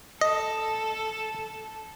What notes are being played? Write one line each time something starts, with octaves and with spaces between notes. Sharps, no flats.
A4 D#5